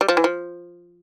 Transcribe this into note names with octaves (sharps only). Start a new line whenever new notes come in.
G3
F3
E3
F3